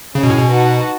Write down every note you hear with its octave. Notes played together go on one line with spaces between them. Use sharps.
C#3 C#4 G#4 C#5
B2
A2
B2
D#4 F#4 B4 F#5 A5